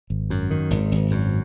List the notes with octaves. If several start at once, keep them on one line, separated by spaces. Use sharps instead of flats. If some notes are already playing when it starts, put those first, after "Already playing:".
G#1
F#2
D#3
G#1
G#1
F#2